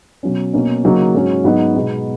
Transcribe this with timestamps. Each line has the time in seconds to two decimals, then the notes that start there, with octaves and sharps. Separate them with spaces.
0.23 B2 F#3 C#4
0.54 B2 A#3 C#4
0.84 C#3 F#3 A#3 D#4
1.15 G#2 F#3 C#4
1.44 G#2 F#3 B3 D#4
1.74 B2 G#3 B3 D#4